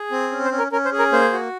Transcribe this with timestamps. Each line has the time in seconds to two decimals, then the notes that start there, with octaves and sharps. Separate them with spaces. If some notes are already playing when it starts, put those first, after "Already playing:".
Already playing: G#4
0.11 C4
0.31 C#4
0.45 C5
0.52 C#4
0.58 A#4
0.72 C#4 A#4
0.85 C5
0.92 G#4
0.99 A#4
1.12 A#3 C5
1.33 F#4